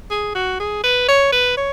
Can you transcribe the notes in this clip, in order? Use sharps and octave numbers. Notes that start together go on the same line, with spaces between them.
G#4
F#4
G#4
B4
C#5
B4
C#5